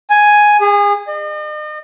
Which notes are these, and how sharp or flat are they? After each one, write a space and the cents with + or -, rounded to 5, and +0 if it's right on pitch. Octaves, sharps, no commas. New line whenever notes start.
G#5 +5
G#4 -30
D#5 -40